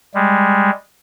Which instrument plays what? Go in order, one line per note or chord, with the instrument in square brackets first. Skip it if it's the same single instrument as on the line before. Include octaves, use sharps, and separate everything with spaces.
[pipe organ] G3 G#3